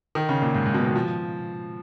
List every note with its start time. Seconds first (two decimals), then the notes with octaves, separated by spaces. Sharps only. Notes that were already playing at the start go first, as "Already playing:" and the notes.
0.15 D#3
0.29 C#3
0.42 A#2
0.55 G#2
0.66 G#2
0.74 B2
0.85 D#3
0.95 F3